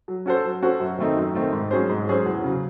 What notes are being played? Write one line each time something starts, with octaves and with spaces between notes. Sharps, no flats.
F#3
C#4 F#4 A4 C5
F#3
C#4 F#4 A4 C5
F#2
D#3 A3 C4 D#4
F#2
D#3 A3 C4 D#4
G#2
F#3 C#4 G#4 C5
G#2
F#3 C#4 G#4 C5
E2
C#3 F#3